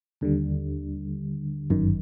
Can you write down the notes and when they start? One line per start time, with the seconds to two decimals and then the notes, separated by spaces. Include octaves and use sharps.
0.21 D#2 D3 G3
1.70 G1 F#2 D#3